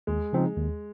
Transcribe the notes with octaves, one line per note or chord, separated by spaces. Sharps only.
D#2 G#3
C#3 F3 C4 D#4
D#2